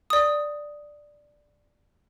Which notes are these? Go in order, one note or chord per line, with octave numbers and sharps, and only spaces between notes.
D5 D#6